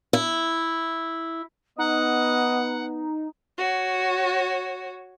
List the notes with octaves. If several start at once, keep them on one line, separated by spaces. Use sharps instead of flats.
E4
B3 D#4 D#5 F#5
F#4 C#5